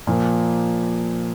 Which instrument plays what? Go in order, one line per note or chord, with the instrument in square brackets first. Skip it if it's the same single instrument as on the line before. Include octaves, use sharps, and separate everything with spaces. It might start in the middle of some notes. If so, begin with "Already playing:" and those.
[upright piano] A#2 F3 A#3